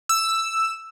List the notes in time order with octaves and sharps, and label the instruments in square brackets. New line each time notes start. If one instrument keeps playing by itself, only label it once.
[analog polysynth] E6